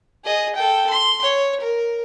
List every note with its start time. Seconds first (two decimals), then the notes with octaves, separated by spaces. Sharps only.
0.24 G#4 D#5
0.56 A4 G5
0.90 C6
1.22 C#5
1.61 A#4